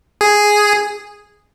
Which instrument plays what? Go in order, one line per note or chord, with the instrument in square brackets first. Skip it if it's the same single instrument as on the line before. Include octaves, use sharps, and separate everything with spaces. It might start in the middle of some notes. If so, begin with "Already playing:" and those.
[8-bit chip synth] G#4